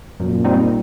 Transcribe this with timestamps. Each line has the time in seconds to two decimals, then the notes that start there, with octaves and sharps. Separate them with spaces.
0.20 F#2 A#2
0.44 D#3 G3 C4 D#4